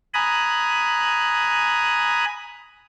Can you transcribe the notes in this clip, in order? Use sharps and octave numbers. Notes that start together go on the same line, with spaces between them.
G#5 A#5 B5 D#6 F#6